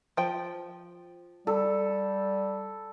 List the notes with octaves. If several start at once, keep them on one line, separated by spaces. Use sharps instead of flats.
F3 G5
G3 A4